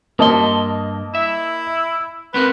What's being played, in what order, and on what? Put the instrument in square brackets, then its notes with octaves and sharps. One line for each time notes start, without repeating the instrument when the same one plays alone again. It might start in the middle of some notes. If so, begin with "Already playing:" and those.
[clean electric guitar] G2 C6 [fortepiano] A#3 [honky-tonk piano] D#5 A5 D#6
[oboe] E4 [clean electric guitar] E5
[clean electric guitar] B3 C4 A#4 [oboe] B4